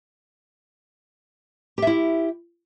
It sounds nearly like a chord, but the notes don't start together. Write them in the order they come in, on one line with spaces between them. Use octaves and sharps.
G4 E5 E4